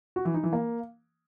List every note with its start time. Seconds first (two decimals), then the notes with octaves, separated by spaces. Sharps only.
0.16 F#4
0.25 E3
0.34 D#4
0.44 E3
0.53 A#3